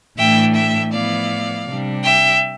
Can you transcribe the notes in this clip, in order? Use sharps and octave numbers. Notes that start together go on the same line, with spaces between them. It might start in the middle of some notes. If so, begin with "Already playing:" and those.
A2 E3 A3 D4 E5 G5
E5 G5
A2 F3 B3 E4 D5 F5
C3 G3 D4
E5 G5